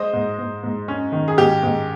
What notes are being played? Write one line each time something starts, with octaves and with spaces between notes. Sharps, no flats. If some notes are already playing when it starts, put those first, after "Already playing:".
Already playing: G#3 C5 D#5
G#2
G#2
G#2
C#4
D#3
G#4
G#2 G4
G#2